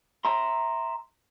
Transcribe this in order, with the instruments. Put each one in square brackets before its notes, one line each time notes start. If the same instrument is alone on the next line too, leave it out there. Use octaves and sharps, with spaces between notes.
[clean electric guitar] E5 A#5 C6